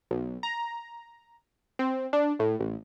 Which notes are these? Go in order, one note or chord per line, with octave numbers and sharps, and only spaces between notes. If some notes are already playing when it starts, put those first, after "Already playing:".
B1
A#5
C4
D4
A2
A1